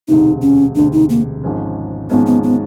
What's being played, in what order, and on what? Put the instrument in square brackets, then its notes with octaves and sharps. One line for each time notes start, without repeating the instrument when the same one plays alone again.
[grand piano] E1 D2 C3 [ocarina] D#4
[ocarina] C#4
[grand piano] E1 D2 C3 [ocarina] D4
[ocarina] D#4
A#3
[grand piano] G#1 G#2 F3 G#3 C#4
[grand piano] G#1 G#2 F3 G#3 C#4 [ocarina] B3
[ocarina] B3
B3